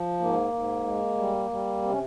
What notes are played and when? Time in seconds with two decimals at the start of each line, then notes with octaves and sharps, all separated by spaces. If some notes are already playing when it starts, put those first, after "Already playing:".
Already playing: F3
0.20 G#2 A#3
0.53 G#2
0.85 G#3
1.18 G3
1.51 G3
1.82 C3 C4
1.91 C#4